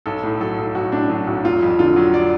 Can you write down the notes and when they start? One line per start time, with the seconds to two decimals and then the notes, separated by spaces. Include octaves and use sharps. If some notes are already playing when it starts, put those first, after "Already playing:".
0.06 B1 A4
0.23 A2
0.40 F#3 A4
0.58 B1
0.75 B1 F#4
0.92 A2 D4
1.10 F#3 D4
1.27 B1 F#4
1.44 F1 F4
1.62 F2
1.79 D3 F4
1.96 F#3
2.14 D5